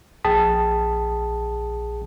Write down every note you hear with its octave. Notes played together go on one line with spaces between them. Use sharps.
A#1 G#4 G5 A5 D#6 B6